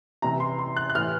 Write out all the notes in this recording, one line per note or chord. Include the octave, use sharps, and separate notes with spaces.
C3 E3 A#5
C6
C6
F#6
F#6
A2 E3 F6